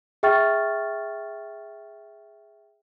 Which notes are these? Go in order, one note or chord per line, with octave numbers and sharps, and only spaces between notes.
G#4 E5 G5 C#6 F6 A6